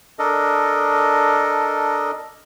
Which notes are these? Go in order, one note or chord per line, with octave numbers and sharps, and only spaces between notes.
D4 A4 A#4 D#5